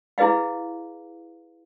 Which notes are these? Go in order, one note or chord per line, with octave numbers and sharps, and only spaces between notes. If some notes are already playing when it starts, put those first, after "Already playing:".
E4 G#4 B4 D#5 F5